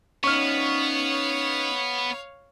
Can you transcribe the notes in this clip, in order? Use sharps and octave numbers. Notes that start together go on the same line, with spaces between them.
B3 C#4 D#4 C#5 F5 C#6 F6